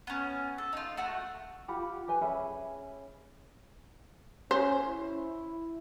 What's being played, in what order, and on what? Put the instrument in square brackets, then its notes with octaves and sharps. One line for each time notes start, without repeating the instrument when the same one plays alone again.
[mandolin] B3 C#4
A4
D#4 F4
A3 F#4 F#5
[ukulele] F4 G4 F#5 B5
G4 B4 G#5
C#4 G#4 E5 B5
[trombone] C#4 [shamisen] C5
[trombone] E4